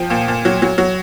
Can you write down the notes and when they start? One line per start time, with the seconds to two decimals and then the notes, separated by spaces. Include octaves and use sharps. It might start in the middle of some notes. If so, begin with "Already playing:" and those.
Already playing: F3 G5
0.10 A#2
0.28 A#2
0.45 F#3
0.62 F#3
0.78 F#3